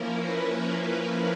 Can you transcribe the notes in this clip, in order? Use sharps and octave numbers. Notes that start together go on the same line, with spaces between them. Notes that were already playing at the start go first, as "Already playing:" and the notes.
Already playing: F3 A#3 C#4 E4 A#4
B4